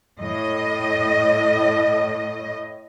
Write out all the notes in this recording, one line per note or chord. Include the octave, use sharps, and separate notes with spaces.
A2 D#5